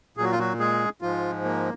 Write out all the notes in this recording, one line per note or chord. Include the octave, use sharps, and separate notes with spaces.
A#2 F#3 F#4 G#4
F4
F#3 F#4
G#3 G#4
G#2 F3 G#3 F4
A#3